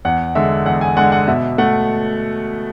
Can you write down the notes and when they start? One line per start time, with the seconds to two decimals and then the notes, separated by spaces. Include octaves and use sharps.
0.05 E2 F#5
0.35 D3 G#3 E5
0.66 E2 F#5
0.81 G#5
0.97 D3 G#3 F#5
1.12 F#5
1.28 B2 E5
1.58 A3 F#5